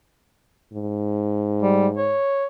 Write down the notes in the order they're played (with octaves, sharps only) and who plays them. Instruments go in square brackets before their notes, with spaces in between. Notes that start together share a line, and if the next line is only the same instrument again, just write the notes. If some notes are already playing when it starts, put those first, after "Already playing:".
[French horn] G#2
[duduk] G3
C#5